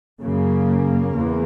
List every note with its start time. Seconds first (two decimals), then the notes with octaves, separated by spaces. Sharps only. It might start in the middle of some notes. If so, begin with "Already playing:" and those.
0.22 F#2 C#3 A#3
1.15 E2